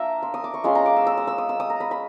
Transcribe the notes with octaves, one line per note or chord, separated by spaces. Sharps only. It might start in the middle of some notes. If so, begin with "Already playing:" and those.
Already playing: A#3 D4 F4 A#4 E5 A#5
C6
D#6
D6
C#6
G#3 C#4 F4 C6
A#5
D6
E6
E6
D#6
E6
D#6
E6
D#6
A#5
B5
B5